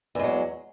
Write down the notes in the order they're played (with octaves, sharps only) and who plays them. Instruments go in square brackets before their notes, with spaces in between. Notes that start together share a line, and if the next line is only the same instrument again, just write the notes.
[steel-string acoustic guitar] E2
G#3
F#3